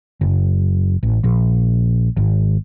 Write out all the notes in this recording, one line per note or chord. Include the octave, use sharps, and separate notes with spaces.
F#1
A1
A#1
G#1